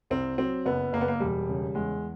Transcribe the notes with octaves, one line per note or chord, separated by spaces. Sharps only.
C2 C4
F#3 C4
F#1 B3
F#1 A#3
B3
A#3
E1 G3
C#3
E2 G#3